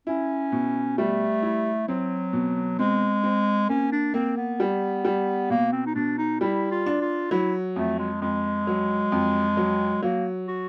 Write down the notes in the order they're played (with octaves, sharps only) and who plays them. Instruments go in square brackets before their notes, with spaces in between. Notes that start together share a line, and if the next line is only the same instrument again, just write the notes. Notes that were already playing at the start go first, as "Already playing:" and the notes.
[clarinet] C#4 [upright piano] E4
[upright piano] B2
[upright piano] G3 [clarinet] A3
[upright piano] E4
[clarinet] F#3 [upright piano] C4
[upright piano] B2
[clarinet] G#3 [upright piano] C4
[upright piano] C4
[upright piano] A#3 [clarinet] C#4
[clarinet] D4
[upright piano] A#3 [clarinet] C4
[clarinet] B3
[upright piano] G3
G3
[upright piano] B2 [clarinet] A#3
[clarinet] C4
D#4
[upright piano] B2 [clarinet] D4
[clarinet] D#4
[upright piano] G3 [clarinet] E4
[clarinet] F4
[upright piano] D4
[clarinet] F4
[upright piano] F#3 [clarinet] E4
[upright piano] F2 [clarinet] A3
[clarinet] G#3
[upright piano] F2 [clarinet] G#3
[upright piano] F#3
F2
F#3
[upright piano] F#3 [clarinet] A#3
[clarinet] F#4